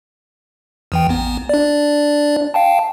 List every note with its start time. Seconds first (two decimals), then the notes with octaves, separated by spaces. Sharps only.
0.92 E2 E3 G5
1.09 A1 B3
1.49 D4 D5
2.54 F5 G5 A5